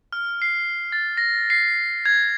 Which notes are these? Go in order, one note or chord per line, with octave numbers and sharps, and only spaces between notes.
F6
C7
A6
A#6
C7
G#6